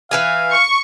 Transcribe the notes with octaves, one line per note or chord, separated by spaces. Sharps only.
E3 B4 F5 G#5
C#6